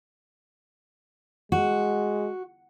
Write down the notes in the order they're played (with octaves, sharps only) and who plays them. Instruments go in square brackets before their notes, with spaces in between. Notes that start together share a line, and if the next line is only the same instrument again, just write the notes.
[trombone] G#3 [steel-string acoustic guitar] F#4